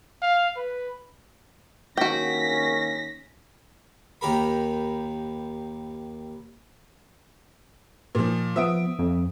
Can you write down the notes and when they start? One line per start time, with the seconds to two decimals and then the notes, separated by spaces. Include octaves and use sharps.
0.22 F5
0.56 B4
1.97 D#3 A#3 C#4 F#4 G5 A#6 B6
4.21 D#2 G4 A#4 B5
8.15 A#2 F3
8.56 F3 B3 E5 D#6 D7
8.99 F2